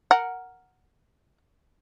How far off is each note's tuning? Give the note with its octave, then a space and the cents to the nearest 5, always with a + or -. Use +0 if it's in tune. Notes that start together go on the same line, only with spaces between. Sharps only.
A#4 +0 F#5 +0